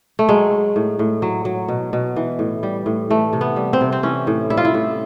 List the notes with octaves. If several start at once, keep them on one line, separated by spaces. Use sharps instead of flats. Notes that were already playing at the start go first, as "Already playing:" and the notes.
A3
F#3 G#3
F#3
A2
A2
F#3
F#3
B2
B2
E3
A2
G3
A2
E3 A3
C3
B3
G3
C4
C3
C4
E3 C#4
A2
G3 E4
F4
E4
A2